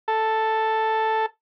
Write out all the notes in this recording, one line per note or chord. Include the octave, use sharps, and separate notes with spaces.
A4